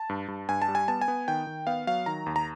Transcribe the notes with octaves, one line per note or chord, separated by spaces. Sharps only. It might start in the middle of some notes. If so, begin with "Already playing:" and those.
Already playing: A5
G2
G2
G2 G#5
A5
G3
G#5
B3 A5
G#5
B3
D#3 G5
D#3
B3 F5
F#3 F5
D#3 A#5
D#2
A#5